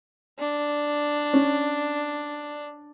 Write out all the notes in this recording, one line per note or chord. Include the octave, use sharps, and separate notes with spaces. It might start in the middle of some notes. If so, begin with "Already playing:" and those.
D4
C#4